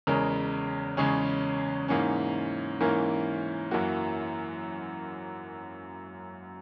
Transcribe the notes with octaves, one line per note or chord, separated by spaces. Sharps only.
E2 C#3 G#3 C#4 A#4
E2 C#3 G#3 C#4 G#4
G#2 E3 A#3 C#4
G#2 E3 A#3 C#4 A#4
F#2 E3 A#3 F#4